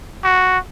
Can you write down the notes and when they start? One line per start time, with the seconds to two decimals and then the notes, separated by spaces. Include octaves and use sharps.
0.24 F#4